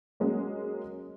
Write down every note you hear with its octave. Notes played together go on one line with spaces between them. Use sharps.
F#3 G#3 A#3 C#4